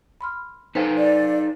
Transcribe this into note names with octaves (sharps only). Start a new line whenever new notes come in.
B5 C6 F6
D#4 A4 B4 C5 F5 G5
D5